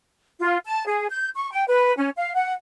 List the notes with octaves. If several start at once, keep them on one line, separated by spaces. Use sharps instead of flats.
F4
A5
G#4
G6
C#6
G5
B4
C#4
F5
F#5